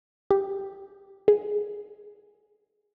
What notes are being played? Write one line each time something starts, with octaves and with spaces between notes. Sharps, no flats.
G4
G#4